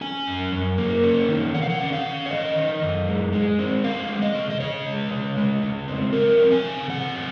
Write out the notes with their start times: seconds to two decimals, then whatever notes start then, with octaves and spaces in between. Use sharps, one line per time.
0.01 C#4 G#5
0.27 F#2
0.52 F#2
0.78 A#3
1.04 C#4
1.29 D#3
1.54 D#3 F#5
1.62 F5
1.69 F#5
1.80 C#4
1.93 F5
2.05 C#4
2.26 C#5
2.31 D#3 D#5
2.56 D#3
2.82 F#2
3.08 G#3
3.33 G#3
3.59 C4
3.84 G#3 F5
4.09 G#3
4.22 D#5
4.35 C#3
4.50 D#5
4.60 C#3 C#5
4.86 G#3
5.11 C#3
5.37 G#3
5.62 C#3
5.88 C4
6.13 F#3 A#4
6.39 C4
6.52 G#5
6.64 C#3
6.90 C4 F#5
7.15 F#3